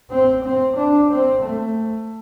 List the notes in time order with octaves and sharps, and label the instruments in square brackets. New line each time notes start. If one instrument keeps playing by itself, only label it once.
[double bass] C4
C4
D4
C4
A3